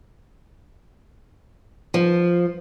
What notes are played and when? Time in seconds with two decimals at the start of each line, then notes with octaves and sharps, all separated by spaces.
1.94 F3